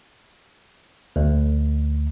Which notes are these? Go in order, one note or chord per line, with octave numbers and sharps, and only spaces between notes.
D2